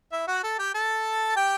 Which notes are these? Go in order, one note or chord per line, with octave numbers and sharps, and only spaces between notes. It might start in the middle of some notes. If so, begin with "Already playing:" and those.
E4 E5
F#4 F#5
A4 A5
G4 G5
A4 A5
G4 G5